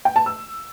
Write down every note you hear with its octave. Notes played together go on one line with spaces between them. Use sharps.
G5
A5
E6